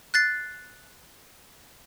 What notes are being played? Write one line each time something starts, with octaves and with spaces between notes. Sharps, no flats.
F#6 A6 C7